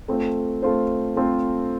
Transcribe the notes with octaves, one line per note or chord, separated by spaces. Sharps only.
A3 C4 F4 A4 C5
A3 C4 F4 A4 C5
A3 C4 F4 A4 C5